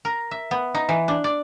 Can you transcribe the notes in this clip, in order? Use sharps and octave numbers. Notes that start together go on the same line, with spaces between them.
A#4
E5
B3
D#4
E3
D4
D5